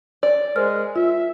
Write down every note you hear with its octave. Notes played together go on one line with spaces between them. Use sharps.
D5
G#3 A#4 C5 F6
F4 E5